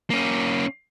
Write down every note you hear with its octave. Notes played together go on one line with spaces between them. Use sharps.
A#3 C#4